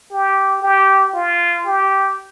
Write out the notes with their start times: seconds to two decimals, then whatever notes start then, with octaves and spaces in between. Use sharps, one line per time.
0.11 G4
0.62 G4
1.15 F4
1.67 G4